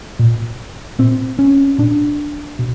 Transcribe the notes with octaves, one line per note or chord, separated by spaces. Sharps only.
A#2
A#2 C4
C#4
A#2 D4
B2